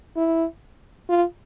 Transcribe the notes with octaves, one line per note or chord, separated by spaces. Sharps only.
E4
F4